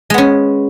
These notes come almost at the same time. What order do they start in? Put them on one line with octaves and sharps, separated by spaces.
G#3 B3 C#4